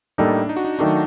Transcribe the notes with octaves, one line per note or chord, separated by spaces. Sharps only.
A2 G3 A#3 D4 D#4 A4
D#4
F#4
D#4
D#3 F#3 A3 D4 D#4